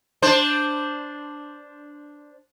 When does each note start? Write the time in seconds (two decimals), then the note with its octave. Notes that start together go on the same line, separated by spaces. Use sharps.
0.22 D4 C5